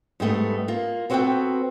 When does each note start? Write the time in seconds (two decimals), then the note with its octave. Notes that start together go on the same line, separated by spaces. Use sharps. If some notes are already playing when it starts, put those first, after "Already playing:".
0.20 G#2 G3 A3 B3
0.68 A#3 F4
1.10 B3 C4 F#4 G#4 A4 G5